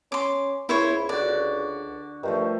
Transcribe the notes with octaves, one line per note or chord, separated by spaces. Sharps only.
C#4 C6 D6
C#2 E4 C5 C#5
D3 F#4 D5
G2 D#3 F3 A3